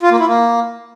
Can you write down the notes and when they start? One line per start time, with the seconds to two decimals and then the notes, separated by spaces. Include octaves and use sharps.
0.03 F4
0.11 A#3
0.20 E4
0.28 A#3